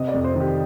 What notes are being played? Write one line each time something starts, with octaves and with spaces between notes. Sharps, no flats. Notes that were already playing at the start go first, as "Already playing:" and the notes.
Already playing: C3 D#5
D5
F2
C5
D#3
G4